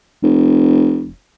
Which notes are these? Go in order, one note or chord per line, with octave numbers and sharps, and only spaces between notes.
F1